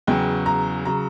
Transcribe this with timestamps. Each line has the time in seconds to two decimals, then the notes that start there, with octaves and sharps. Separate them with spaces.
0.07 E2 C#3 F#3 G5
0.46 A#5
0.85 C#3 F#3 A#5